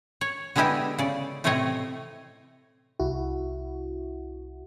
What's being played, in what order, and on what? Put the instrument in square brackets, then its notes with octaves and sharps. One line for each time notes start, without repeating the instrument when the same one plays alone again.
[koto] C#5
D3 G#3 B3 E4 G4 D#5
C#3 D5
A2 C3 A3 C4 C#5 D#5
[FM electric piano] C2 E4 F#4